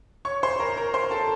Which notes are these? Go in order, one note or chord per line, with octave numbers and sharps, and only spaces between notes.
C#5 C#6
C5 C6
A#4 A#5
A#4 A#5
C5 C6
A4 A5